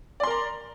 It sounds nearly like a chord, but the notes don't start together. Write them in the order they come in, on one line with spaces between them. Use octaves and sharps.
D5 C6 A#4 A#5